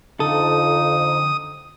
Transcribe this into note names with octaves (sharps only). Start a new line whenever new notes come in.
F2 D3 F3 D#4 A4 D#6